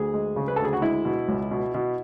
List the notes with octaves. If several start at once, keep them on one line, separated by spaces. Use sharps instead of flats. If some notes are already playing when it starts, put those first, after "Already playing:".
Already playing: D2 G#4
G#3
C#3
B4
D2 A4
G#4
F#4
G#3 E4
B2
C#2
B2
B2